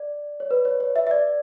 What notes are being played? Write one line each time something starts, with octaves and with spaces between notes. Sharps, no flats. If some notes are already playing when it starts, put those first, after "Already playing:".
Already playing: D5
C#5
B4
C#5
C#5
E5
E5
D5